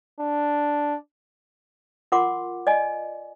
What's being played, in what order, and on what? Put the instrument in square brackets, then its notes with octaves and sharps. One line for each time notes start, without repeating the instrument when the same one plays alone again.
[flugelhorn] D4
[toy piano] F4 A#4 F#5 C6 D6
D5 D#5 G#5